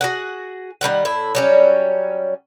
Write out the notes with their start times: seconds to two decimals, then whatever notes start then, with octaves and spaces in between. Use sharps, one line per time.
0.01 F#4 G#4 F#5
0.81 D#3 G3 F4 F#5
1.05 A2 E4
1.35 F#3 G3 C#4